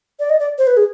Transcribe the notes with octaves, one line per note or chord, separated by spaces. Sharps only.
D5
D#5
D5
C5
B4
G#4